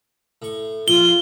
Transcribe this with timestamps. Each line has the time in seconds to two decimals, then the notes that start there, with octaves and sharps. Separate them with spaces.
0.42 A2 C#6
0.88 A#1 F4 G7